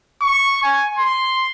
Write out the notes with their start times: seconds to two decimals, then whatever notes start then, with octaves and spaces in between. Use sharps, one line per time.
0.22 C#6
0.63 G#5
0.98 C6